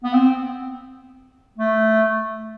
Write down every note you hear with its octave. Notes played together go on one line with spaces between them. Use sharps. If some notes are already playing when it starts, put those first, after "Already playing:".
B3
C4
A3